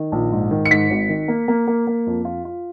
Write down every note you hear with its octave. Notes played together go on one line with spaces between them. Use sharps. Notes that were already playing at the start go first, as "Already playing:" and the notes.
Already playing: D#3
A#1
G#2
D#3
C#7
G#2 B6
G#1
D#3
A#3
A#3
A#3
A#3
F2
F4
F4